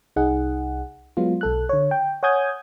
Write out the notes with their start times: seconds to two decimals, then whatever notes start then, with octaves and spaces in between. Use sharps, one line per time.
0.16 C2 D#4 G#4 F#5
1.17 F#3 G#3 B3 F4
1.41 B1 A4 F#6
1.69 D3 C#5
1.91 G5
2.23 C#5 F#5 G#5 D#6 G6 G#6